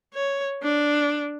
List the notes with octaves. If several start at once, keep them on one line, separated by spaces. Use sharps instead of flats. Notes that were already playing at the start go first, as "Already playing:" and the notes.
C#5
D4